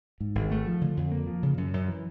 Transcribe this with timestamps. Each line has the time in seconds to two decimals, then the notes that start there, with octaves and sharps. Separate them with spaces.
0.20 G#2
0.35 G#1
0.51 A3
0.67 F3
0.81 D3
0.97 F2
1.12 A#3
1.27 F3
1.43 C#3
1.58 F#2
1.74 F#2
1.88 E3